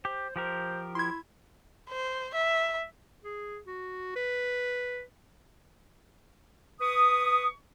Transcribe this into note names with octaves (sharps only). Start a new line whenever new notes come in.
G4 C5
F3 G4 A#4 C5
E4 C6 G#6
C5
E5
G#4
F#4
B4
B4 C#6 D#6